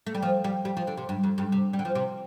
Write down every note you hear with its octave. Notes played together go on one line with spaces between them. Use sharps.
A3
G3
F3
G3
G3
F3
D3
C3
G2
F2
G2
C3
G3
D3
F3
C3